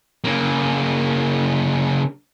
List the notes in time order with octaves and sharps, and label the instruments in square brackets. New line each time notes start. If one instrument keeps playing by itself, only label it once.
[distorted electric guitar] C#3 A#3